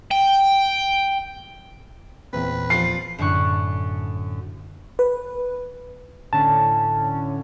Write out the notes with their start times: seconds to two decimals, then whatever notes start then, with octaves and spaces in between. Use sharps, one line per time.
0.11 G5
2.33 E2 A#2 C4 B4
2.70 F3 C7
3.18 F#2 A2 D3 D4 C#6 F#6
4.99 B4
6.33 A2 D3 C#4 A5